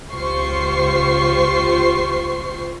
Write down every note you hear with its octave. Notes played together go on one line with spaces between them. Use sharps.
C#2 F4 G4 C5 C#6 C7